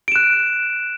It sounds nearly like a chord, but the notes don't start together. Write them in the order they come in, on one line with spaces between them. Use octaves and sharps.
D7 E7 F#6